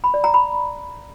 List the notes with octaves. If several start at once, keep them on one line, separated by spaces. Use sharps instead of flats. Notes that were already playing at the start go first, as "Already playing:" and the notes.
B5
D5
A#5
B5